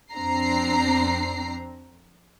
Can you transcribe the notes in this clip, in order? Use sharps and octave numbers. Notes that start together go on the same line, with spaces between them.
F2 C4 D4 A#5 C7